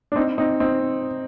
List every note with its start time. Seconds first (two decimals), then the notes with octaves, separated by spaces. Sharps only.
0.12 D4
0.16 C4 D#4
0.38 C4 D#4
0.60 C4 D#4